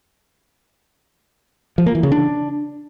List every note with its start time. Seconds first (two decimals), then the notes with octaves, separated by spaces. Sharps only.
1.78 F3
1.86 A#3
1.95 E3
2.03 C#3
2.12 D4